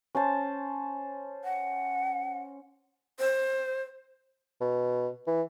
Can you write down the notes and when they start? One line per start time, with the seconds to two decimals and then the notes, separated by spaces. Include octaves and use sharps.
0.15 C#4 C5 A5
1.44 F#5
3.19 C5
4.61 B2
5.27 E3